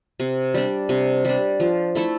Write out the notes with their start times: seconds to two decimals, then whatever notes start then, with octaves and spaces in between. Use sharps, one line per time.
0.20 C3
0.54 G3 D4
0.89 C3
1.25 G3 D4
1.60 F3
1.95 A3 E4 A4